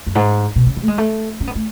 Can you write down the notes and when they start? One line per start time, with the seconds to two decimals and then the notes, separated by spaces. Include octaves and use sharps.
0.07 F#2
0.15 G#2
0.56 B2
0.66 C#3
0.77 D#3
0.83 A3
0.88 G#3
0.98 A3
1.40 C#4
1.47 B3
1.55 A3